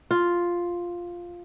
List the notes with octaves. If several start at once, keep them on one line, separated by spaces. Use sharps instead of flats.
F4